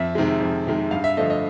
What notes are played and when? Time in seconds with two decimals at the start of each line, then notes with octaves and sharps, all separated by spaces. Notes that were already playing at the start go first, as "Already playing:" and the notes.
Already playing: F2 E5
0.15 C3 D#3 G#3
0.41 F2
0.67 C3 D#3 G#3
0.91 G2 F5
1.04 E5
1.17 D3 F3 A3 D#5
1.30 D#5